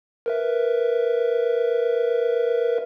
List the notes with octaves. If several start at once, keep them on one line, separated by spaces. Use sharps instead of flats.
A#4 B4 E5